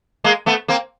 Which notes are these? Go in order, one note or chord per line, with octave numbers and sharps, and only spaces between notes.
G#3 A#3
A3 B3
A#3 C4